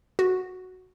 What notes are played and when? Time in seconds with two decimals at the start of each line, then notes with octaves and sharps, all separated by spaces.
0.19 F#4